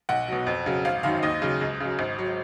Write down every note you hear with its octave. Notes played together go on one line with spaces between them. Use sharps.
B1 F#5
B2 F#3
F2
C#3 F#3
G#1 F5
F#2 D#3 F#3 F5
D#2 D#5
C#3 F#3
C#2
C#3 F#3
G#1
F#3